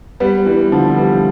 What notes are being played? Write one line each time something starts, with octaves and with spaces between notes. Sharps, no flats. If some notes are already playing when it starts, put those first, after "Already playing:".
G3 B3
E3 G3
D3 F3
E3 G3